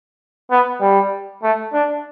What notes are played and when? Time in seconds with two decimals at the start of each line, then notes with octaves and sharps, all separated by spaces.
0.51 B3
0.81 G3
1.43 A3
1.73 D4